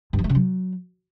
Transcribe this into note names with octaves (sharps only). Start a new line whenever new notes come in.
G2
F3
A3
C#3
F#3